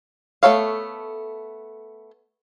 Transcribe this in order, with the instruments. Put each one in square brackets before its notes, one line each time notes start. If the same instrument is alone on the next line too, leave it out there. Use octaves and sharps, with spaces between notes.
[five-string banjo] A3 B3 A4 C#5 F5